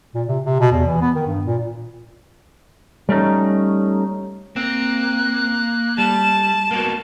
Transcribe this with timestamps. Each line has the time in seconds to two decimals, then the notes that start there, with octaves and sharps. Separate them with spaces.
0.15 A#2
0.28 C3
0.46 C3
0.60 B2
0.72 E2
0.86 E3
1.01 B3
1.15 D#3
1.27 G2
1.46 A#2
3.09 G3 A3 C#4 D#4
4.56 A#3 C4 F#6
5.98 G3 A5 E7
6.71 A#3 B3 F#4